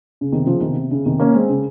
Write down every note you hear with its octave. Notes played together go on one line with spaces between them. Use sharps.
C#3
C3 D#3
C#3 F3
C3 D#3
C3
C#3
C3 D#3
A#3 C#4
G#3 C4
C#3